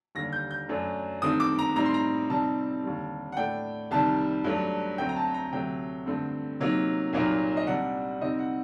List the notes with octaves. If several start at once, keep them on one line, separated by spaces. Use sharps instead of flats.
D#2 D3 G3 A#6
G6
G6
F#2 F#3 A3 D4
G2 D#3 A3 C4 D#6
D6
A#5
A2 G3 C4 D#4 A#5
C6
A#5
C3 G3 C4 D#4 A5
D#2 D3 G3
F#5
A2 A3 D4 G5
C2 C3 D#3 G3 A5
G2 F#3 A3 D4
D2 D3 F#3 C4 G5
A#5
A5
A#5
D2 C3 F#3 A3 G5
G2 D3 A3 C4
C3 F#3 A#3 D#4
C2 A#2 F#3 A#3 D#4
D#5
C3 G3 D4 F#5
C3 G3 C4 D#4 D#5
F#5